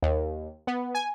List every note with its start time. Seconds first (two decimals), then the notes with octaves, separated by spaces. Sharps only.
0.03 D#2
0.67 B3
0.95 G#5